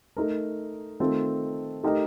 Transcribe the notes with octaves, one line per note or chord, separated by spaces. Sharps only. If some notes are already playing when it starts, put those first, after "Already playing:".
A3 D#4 A#4
D#3 A3 C4 F4 A4
A3 D#4 G4 A#4 D#5